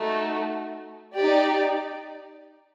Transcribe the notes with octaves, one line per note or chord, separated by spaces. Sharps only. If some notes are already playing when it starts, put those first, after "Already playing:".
Already playing: A3 D#4 F#4
D#4 G4 D5